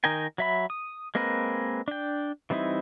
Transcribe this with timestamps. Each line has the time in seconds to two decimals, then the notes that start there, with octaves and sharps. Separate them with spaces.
0.04 D#3 D#4 A#4 G5 G#5
0.38 F#3 E5 B5
0.70 D#6
1.15 G#3 A#3 C4 A#4 B4
1.88 D4 G5
2.50 E3 G3 C4 D#4 E4